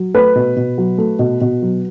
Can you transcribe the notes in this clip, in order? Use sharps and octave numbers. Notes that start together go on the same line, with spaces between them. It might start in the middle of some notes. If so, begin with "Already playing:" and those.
Already playing: F#3
A3 B4
B2
B2
F#3
A3
B2
B2
F#3